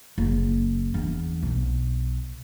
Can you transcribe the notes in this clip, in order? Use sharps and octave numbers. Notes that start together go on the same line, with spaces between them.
F#1
E2 D4
B1